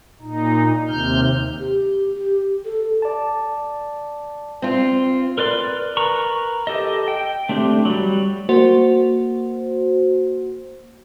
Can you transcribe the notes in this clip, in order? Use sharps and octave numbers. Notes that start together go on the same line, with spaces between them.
A#2 D#4
D#2 C3 F6 G6
G4
G4
A4
D5 A5
C4 F4
A#4 B4 D5 C6
A#4 B4 A#5 C#6
G4 A4 D#5
G5
A3 C4 D4 G4
F#3 G3
A#3 F#4 C5